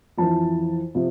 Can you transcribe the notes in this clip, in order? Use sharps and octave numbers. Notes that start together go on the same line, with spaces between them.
F2 E3 A5
C3 F3